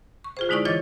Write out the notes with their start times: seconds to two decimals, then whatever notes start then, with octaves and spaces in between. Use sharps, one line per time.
0.24 C#6
0.37 F4 G#4 C5
0.49 D3 G#3 D#4 E4 D5 C#6
0.65 E3 F4 C#5 D#5 D6 A6